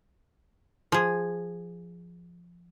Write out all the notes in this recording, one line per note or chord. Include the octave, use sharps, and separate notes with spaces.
F3 G#4